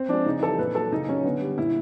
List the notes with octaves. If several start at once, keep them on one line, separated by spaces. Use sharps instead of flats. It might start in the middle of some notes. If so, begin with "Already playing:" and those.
Already playing: C4
F3 G#3 D4
C#3 D#4
E3 G3 A4
A#2 B4
F#3 A4
C#3 D#4
F#3 C#4
D3 B3
G3
A#2 E4